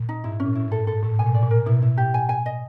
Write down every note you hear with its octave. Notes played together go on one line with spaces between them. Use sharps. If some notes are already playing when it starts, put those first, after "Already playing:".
Already playing: A#2
D#4
G#2 E4
C#4
A#2
A2 E4
G#2 A4
G#2 A4
A2 A4
B2 G#5
A#2
A2 D5
A#2
A#4
B2 E4
E4
G4
G#5
G#5
D#5